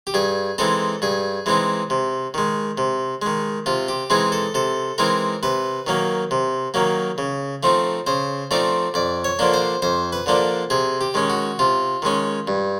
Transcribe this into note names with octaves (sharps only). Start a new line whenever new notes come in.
G4
G2 G#4
E3 G#3 C4 D#4 A4
G2 G#4
E3 G#3 C4 D#4
C3
D#3 G#3
C3
D#3 G#3
C3 F4
G4
E3 G#3 C4 D#4 G#4
A4
C3 A4
E3 G#3 C4 D#4 A#4
C3 B4
D#3 F#3 A#3
C3
D#3 F#3 A#3
C#3
F3 A3 C4 D#4
C#3 C5
F3 A3 C4 D#4 D5
F2 D5
C#5
D3 F3 A#3 D4
C5
F2 C5
B4
D3 F3 A#3 D4
C3 G#4
G4
D#3 G#3 C#4
F#4
C3 F4
D#3 G#3 C#4
G2